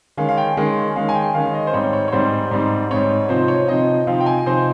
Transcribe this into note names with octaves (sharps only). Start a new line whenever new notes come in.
D#3 G#3 C#4 F5
F5
G5
D#3 G#3 C#4
D#3 G#3 C#4 F5
G#5
G5
D#3 G#3 C#4 F5
D#5
C5
G#2 G3 C4 D#4 C#5
C#5
C#5
G#2 G3 C4 D#4 C5
G#2 G3 C4 D#4
G#2 G3 C4 D#4 C#5
C3 F3 C4 D#4 C5
C#5
C3 F3 C4 D#4 D#5
C3 F3 C4 D#4 F5
G5
G#5
C3 F3 C4 D#4 C5